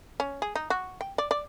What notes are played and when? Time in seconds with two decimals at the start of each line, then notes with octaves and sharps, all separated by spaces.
0.20 C#4
0.42 G#4
0.55 D#4
0.70 F#4
1.01 G5
1.18 D5
1.31 D5